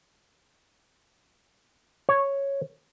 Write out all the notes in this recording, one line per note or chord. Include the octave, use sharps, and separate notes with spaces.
C#5